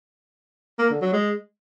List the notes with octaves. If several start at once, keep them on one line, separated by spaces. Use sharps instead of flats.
A#3
D3
F#3
G#3